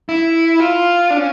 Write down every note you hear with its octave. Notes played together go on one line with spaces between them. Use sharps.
E4
F4
D4
C#4